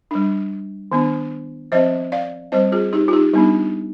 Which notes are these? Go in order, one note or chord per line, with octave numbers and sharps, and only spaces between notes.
G3 D4
D#3 B3 D4
F3 C4 C5 D#5
D5 F5
G3 C4 C5 D#5
F4 G#4
D#4 G4
F4
D#4 G4
G3 B3 D4 D#4